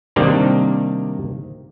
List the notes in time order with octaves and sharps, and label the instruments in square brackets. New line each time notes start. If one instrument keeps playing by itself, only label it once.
[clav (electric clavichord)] C3 D#3 G3 A#3 D4